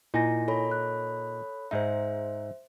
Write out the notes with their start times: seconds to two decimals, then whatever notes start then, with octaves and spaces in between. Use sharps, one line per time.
0.14 A#2 D#4 E4 G#5 A#6
0.48 A4 C#5 B5
0.71 F#6
1.71 G#2 D#4 C5 E5